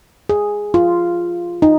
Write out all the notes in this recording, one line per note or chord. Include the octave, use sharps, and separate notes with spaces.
G#4
F4
D#4